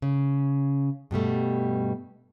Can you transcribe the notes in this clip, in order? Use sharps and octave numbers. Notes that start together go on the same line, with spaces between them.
C#3
G2 B2 G3 A3